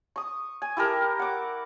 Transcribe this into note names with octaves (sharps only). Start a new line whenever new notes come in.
C#6 D#6
G#5
E4 G4 A4 A#4
F#5 D6